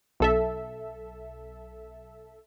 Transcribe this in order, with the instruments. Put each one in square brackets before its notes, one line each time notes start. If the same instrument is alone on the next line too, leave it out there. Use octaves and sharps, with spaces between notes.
[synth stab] B1 A4 E5